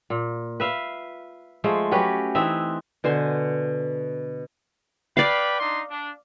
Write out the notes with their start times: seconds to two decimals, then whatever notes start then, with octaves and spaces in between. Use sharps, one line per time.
0.10 A#2
0.60 B4 E5 F5
1.64 F3 G#3 A3 C5
1.91 F#3 C#4 G4 B4
2.35 E3 C4 D#4 E5
3.04 B2 D3 C5 G#5
5.17 B4 D5 F5 G5 B5
5.60 D4 D#4 C6
5.90 D4